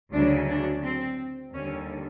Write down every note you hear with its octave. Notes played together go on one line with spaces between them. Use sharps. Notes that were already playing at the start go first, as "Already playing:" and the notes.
D2 C#3 F#3 D4
D4
C4
D#2 D3 G3 C#4